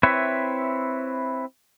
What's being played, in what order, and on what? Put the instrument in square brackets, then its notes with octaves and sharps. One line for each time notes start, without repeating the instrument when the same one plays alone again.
[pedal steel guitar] C4 E4 B4 C#5 E5